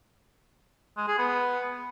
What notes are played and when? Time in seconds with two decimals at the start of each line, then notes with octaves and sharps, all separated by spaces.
0.97 G#3
1.08 G#4
1.18 B3